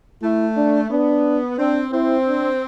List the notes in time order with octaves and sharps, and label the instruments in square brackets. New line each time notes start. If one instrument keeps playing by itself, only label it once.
[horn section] A3 [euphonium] E4
[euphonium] D4
[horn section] B3 [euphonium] D4
[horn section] C4 [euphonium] D4
[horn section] C4 [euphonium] E4
[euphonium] D4